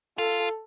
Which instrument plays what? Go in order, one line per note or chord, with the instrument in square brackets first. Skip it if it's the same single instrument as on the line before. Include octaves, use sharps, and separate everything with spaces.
[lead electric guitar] F4 [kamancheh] A4